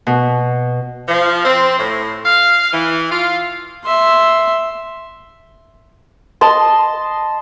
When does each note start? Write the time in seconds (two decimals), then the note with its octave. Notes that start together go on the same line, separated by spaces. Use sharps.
0.07 B2
1.08 F3
1.45 C4
1.79 A2
2.25 F5
2.73 E3
3.11 F4
3.85 E5 C6
6.41 D#5 A5 C6